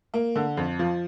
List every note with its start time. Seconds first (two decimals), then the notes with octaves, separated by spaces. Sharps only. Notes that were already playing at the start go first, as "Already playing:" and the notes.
0.14 A#3
0.36 D3
0.57 F2
0.79 F3